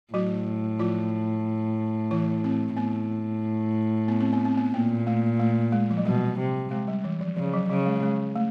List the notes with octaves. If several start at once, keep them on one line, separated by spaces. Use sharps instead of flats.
A2 F#3 F#4
F3 F4
E3 E4
C4
A2 B3
B3
C4
B3
C4
B3
A#2 A#3
A3
A3
G#3
F3
F#3
B2 G3
C3
G#3
G3
E3
F3
C#3 F3
F#3
C#3 F#3
G#3
G#3
A3